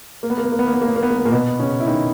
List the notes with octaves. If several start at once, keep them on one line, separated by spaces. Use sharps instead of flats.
A#3
B3
A#3
B3
A#3
B3
A#3
B3
A#3
B3
A#3
B3
A#3
B3
A#2 A#3
B2 B3
C#3 C#4
E4
D#3 D#4